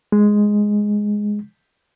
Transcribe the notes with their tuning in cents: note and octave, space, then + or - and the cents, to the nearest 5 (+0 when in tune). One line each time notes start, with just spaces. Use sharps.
G#3 +0